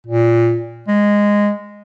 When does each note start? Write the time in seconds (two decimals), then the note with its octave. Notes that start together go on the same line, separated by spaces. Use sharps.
0.06 A#2
0.88 G#3